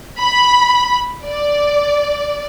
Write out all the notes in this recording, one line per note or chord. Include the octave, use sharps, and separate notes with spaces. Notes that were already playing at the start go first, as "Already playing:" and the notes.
B5
D5